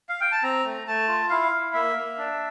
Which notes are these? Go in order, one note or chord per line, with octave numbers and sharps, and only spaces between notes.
F5
G5
A5
C4 A#5
A3
A3 A5
F4
E4 F5
E4
A#3 E5
A#3
D4